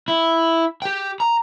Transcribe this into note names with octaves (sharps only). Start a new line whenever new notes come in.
E4
G4 G5
A#5